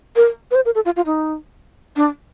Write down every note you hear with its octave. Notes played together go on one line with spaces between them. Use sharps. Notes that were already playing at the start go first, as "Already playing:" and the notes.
A#4
B4
C5
A#4
A4
F4
F4
D#4
D4